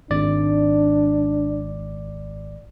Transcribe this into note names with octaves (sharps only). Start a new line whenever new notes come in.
G#1 D4 D5